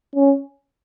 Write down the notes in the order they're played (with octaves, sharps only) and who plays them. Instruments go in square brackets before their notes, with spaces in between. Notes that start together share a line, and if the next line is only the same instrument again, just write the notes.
[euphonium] C#4